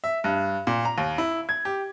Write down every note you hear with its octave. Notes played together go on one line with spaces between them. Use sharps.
E5
G2
A#2
A#5
D#2
E4
G#6
G4